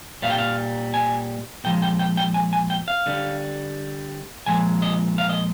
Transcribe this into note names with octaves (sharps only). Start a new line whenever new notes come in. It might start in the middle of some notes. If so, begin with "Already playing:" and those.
A#2 G3 F5
G5
F5
G#5
A#2 F3 G#3 G5
G5
G5
G5
G#5
G#5
G5
F5
D3 G3
A#2 F3 G#3 G#5
D#5
F5
D#5